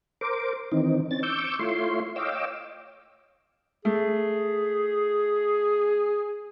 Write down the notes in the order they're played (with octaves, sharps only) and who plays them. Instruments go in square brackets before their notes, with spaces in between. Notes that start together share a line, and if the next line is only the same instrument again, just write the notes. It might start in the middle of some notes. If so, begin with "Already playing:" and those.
[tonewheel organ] A#4 C5 D6
D#3 E3 C4 D#4
C4 C#4 A6
C#6 D6 E6 G6
A3 E4 F4 C#5 C6
C#5 D#5 F5 G5 D6 E6
[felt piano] A3 [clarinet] G#4